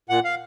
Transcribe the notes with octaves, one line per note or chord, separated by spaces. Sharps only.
A#2 F#5
F5